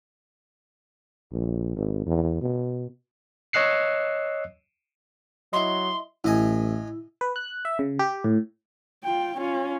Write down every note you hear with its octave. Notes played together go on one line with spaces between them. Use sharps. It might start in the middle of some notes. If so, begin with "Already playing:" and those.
A#1
G#1
E2
B2
C#5 D#5 E6 F#6 C7 C#7
F#3 E4 D#5 C6
A1 A2 E4 D#5 G#5
B4
F#6
E5
C#3
G4
A2
F4 G5
C#4 F4